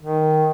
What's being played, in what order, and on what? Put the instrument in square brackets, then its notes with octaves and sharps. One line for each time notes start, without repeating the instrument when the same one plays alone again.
[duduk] D#3